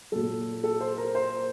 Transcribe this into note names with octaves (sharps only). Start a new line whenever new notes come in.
A#2 F#3 A4
A4
C5
A#4
C5